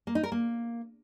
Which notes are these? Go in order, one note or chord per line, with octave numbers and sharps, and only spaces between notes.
A#3
D#4
A#4
A#3